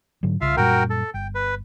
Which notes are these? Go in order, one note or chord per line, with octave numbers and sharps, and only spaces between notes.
G#2 D3 F#3
C2 C#3 F4 E5 F5
F#2 A#2 G3 F#4 A#4 G5
A4
G1 G5
B4